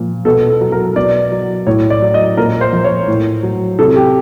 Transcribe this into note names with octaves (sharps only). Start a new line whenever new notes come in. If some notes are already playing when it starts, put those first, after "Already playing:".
Already playing: A#2 F3
B2 A4
A4
F#3
A#4
B2 D5
F#3
A2 C#5
D5
F#3
D#5
A#2 A#4
C5
F3
C#5
A2
F#3
C3 A4
G4